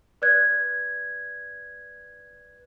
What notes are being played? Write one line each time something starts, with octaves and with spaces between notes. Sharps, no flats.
B4 D5 F#6 G#6